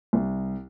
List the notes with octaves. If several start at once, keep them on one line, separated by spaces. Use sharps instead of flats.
C2